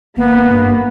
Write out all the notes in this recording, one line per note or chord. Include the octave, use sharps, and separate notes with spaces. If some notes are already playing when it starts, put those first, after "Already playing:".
G#1 A#3 B3
G2